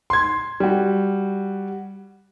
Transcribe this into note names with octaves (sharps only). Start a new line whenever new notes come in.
C6 G#6
G3 F#4